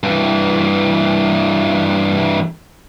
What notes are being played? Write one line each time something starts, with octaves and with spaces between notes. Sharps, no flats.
G2 E3